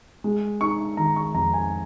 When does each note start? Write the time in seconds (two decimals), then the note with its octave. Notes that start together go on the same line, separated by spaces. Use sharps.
0.24 G#3
0.61 D#4 C#6
0.97 D#3 A#5
1.16 C#6
1.34 F2 A#5
1.54 G#5